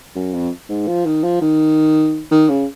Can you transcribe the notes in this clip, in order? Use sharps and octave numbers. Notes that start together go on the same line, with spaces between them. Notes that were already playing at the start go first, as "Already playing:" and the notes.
F#2
F2
G#2
F3
D#3
F3
D#3
D#3
C#3